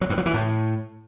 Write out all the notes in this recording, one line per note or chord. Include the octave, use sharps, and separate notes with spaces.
F#3
G2
F#3
E3
A2